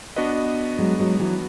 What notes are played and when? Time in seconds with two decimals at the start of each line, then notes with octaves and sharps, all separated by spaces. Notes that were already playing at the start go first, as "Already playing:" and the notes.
0.16 B3 D4 F#4 B4 D#5
0.78 F#3 G#3
0.99 F#3 G#3
1.19 E3 F#3